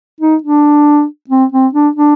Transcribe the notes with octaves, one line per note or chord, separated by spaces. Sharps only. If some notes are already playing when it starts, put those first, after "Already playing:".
D#4
D4
C4
C4
D4
D4